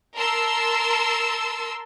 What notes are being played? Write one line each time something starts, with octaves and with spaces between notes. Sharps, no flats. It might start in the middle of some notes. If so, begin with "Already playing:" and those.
A#4 A5 C6 E6